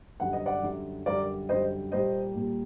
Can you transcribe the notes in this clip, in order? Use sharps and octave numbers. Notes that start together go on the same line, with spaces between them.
F#2 D3 G3 F#5
D#5
D5 F#5
F#2 D3 G3
F#2 D3 G3 A#4 D5
F#2 D3 G3 C5 D#5
A#2 G3 A#3 C5 D#5
A#2 G3 A#3